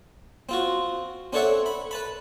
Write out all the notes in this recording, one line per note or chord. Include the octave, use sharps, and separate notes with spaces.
C4 F4 F#4
C4 D4 A4 C#5 E5 F#5
B5
B4 A5 B5